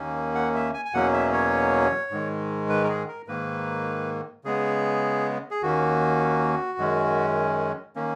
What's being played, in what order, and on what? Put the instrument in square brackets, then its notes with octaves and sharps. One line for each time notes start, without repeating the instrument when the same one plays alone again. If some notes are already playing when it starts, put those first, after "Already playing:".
Already playing: [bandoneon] D#2 D#3 A#3 C#4
F#5
E5
G#5
G#5
E2 B2 F#3 A#3 C#4 F#5
E5
C#5
G#2 D#3 G#3
B4
A#4
G#4
A#4
G#2 D#3 A#3 B4
C#3 G#3 B3 G#4
G#4
D#2 D#3 A#3 C#4 F#4
F#2 D#3 G#3 C#4
D#3 A#3 C#4